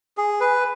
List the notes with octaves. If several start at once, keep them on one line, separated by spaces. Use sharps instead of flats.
G#4
B4